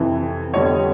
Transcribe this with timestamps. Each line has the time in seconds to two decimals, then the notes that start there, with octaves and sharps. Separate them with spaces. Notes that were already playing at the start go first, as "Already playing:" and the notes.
Already playing: F2 C3 E3
0.53 F2 D3 G3 B3 C#5 D#5